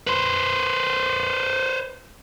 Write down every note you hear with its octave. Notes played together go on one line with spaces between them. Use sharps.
B4 C5